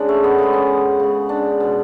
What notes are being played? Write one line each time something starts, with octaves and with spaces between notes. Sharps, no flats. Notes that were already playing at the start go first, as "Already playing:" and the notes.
Already playing: C#3 G#3 D4
A3
B3
C#3 G#3 A3
C#4
C#3 G#3
D4
B2 G#3